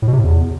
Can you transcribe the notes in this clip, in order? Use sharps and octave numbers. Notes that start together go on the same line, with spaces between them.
A2
B2
C3
A2
E2